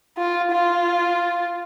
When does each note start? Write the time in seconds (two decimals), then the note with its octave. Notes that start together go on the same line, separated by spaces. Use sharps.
0.18 F4
0.52 F4